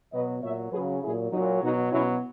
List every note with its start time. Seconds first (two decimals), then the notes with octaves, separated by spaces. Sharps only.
0.12 B2 F#3 B4 D#5
0.43 A#2 F#3 C#5 E5
0.72 F#3 G#4 B4
0.76 C#3
1.03 A#2 F#3 E4 G#4
1.32 F#3 D#4 F#4
1.37 A#2
1.61 B2 F#3 D#4 F#4
1.91 B2 F#3 C#4 E4